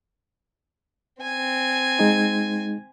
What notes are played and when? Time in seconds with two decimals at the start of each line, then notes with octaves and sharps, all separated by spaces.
1.22 C4 G#5
1.99 G#3 D#4